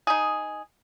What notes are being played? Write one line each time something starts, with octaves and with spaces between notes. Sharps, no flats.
D#4 G#4